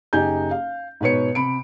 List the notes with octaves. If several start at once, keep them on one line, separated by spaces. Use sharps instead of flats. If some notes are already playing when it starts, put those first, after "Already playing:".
F#1 D#4 G4 G#5 G6
F5
G#2 B2 B4 C#5 C#7
C3 B5 D7